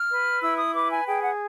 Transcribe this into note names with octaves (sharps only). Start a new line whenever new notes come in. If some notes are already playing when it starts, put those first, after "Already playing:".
Already playing: F6
B4
E4 E6
D#6
B4 D6
G#5
G#4 G5
F#5